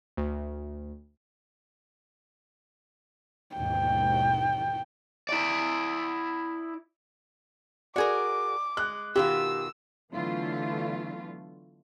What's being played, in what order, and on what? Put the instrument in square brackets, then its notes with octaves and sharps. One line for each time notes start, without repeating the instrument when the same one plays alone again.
[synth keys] D2
[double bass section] D#2 G#2 B2 [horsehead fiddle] G5
[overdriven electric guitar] E4 D5
[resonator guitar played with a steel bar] F#4 G#4 A#4 [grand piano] D5 [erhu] D6
[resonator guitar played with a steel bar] G#3 [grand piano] F#6
[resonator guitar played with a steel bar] B2 D#3 F4 [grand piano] G4 [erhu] E6
[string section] D3 E3 F#3 A3 B3 F4